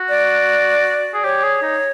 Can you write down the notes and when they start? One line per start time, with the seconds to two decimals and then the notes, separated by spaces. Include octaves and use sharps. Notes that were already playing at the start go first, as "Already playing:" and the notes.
Already playing: F#4
0.09 D5
1.14 G#4
1.24 G4 C#5
1.43 G#4
1.62 D#4